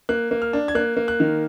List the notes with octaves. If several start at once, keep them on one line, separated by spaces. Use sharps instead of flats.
A#3 F#6
A#3
F6
D4
G#6
A#3 F#6
A#3
F#6
D#3